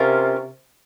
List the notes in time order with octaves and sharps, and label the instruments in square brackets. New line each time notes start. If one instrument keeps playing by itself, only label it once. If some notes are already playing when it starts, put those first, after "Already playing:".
Already playing: [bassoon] C3 [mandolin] C#4 F4 A#4